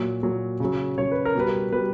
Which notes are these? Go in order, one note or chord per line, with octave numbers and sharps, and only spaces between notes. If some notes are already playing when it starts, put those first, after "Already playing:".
Already playing: A#2 F#3
A#2 F#3
C#3 F#3
C#3 F#3 C#5
B4
A#4
B2 G3 B4
B2 G3 B4